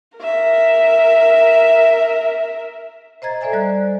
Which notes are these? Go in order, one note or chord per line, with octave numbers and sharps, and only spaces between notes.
A#4 E5
C5 D#5 A#5 G#6 A6
A4 C5 D5 E5 G#5 A#5
G3 D5 F#6